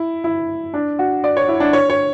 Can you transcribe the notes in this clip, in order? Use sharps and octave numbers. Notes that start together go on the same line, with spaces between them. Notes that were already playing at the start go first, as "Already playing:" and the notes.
Already playing: E4
E4
D4
F#4
D5
C#5
E4
D4
C#5
C#5